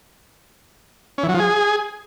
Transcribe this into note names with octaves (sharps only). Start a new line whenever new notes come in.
C#4
E3
F#3
F3
G#4